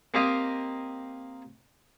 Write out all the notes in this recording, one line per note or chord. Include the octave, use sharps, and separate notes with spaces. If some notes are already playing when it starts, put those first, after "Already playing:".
A#3 C4 G4 D#5 F5 A#5